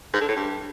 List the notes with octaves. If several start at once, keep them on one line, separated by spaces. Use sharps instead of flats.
G#2
D3
A2
G2